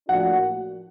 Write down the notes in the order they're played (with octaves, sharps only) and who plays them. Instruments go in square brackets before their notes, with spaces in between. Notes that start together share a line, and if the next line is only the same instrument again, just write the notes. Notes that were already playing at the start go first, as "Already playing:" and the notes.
[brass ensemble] A2 F3 A#3 D4 F#4 [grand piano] F#5